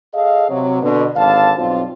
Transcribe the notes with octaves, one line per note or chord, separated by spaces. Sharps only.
G#4 A4 D#5 F5
C3 F#3
B2 D3
G#1 D3 F5 A5
B1 G2 C4 F4